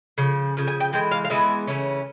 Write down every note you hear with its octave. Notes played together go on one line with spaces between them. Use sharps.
C#3 F3
C#3 F3
G#5
G5
E3 G#3 G5
F5
F5
E3 G#3 B3 E5
C#3 E3 A3 C#4